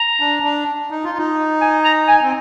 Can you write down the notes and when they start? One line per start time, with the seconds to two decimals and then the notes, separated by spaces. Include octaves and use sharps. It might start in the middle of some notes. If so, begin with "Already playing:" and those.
Already playing: A#5
0.20 D4
0.43 D4
0.91 D#4
1.04 F4
1.18 D#4
1.61 G#5
1.84 A#5
2.08 G#5
2.23 C4